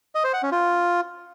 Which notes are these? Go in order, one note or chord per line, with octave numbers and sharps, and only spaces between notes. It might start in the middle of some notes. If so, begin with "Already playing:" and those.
D#5
C5
F#5
C#4
F4